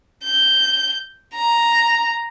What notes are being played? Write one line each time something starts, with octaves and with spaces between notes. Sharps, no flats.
G6
A#5